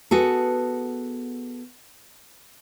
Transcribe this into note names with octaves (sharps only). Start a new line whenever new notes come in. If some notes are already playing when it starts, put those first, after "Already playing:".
B3 F#4 G#4 A4